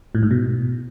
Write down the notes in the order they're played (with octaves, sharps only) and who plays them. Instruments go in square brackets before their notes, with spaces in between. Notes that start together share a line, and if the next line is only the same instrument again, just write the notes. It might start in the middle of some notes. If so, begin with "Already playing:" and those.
[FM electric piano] A2
G#2
B2